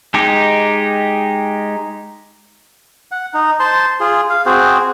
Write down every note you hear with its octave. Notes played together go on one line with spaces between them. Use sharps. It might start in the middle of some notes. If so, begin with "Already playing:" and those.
G#3 D#4 G4
F#5
D#4
C5 A5 C6
F4 G#4
F5
C4 F#4 G#4 C5